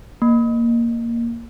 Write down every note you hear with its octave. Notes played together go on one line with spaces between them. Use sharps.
A#3